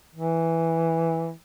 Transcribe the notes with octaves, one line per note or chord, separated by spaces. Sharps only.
E3